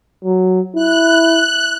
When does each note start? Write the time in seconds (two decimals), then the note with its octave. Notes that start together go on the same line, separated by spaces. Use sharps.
0.24 F#3
0.76 E4 F#6